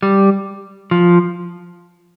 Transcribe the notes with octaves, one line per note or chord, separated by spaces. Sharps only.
G3
F3